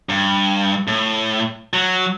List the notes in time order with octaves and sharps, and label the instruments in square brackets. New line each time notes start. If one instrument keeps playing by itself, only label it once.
[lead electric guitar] G2
A2
F#3